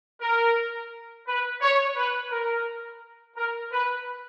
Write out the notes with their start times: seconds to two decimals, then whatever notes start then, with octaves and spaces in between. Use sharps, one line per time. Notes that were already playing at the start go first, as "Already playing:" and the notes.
0.21 A#4
1.27 B4
1.61 C#5
1.96 B4
2.31 A#4
3.36 A#4
3.71 B4